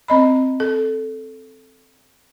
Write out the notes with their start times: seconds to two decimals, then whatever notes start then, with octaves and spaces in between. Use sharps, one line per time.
0.08 C4 D#5 B5
0.60 A4